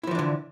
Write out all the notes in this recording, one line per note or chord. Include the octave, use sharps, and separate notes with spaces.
D3 E3 F3 D4 E4